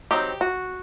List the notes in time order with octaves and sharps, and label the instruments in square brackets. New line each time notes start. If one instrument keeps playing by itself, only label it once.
[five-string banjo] F#3 C4 D#4 G4
F#4